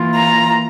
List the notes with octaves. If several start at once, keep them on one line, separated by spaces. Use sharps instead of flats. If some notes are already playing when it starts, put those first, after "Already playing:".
Already playing: E3 A#3 F4
A#5